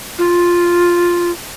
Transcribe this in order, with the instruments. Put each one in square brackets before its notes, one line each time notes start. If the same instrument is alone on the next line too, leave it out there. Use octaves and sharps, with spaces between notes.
[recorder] F4